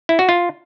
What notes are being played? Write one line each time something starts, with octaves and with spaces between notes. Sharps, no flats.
E4
F#4
F4